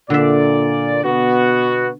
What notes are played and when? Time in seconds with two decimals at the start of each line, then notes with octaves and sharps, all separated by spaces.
0.10 A#2 D3 D5 E5
1.04 B2 B3 F#4